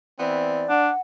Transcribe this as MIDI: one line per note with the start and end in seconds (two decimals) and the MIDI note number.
0.19 0.70 52
0.19 0.70 59
0.19 0.70 60
0.19 0.81 74
0.69 0.90 62
0.69 1.01 78